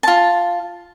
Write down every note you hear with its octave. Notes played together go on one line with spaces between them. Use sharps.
F4 A5